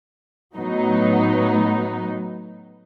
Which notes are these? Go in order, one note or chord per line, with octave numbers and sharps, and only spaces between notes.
A2 F#3 B3 D#4